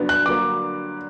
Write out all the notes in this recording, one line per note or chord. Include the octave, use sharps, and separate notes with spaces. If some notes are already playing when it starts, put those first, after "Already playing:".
Already playing: G2 D3 F#3 B3 D4
F#6
G2 D3 F#3 A#3 D6